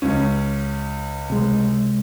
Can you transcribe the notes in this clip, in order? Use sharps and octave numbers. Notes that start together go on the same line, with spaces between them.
C#2 C#4
C3 G#3